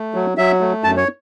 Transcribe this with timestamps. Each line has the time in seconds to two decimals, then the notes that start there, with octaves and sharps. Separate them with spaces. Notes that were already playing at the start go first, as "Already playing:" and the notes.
Already playing: A3
0.14 F#3
0.38 F#3 E5
0.61 A3
0.84 F#2 A5
0.97 C#5